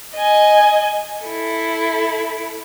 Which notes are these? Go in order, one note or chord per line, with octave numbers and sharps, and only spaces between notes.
D#5 G#5
E4 A4